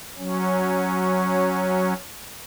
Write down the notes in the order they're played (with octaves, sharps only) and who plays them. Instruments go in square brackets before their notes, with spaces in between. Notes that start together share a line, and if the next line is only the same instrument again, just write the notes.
[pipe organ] F#3 C#4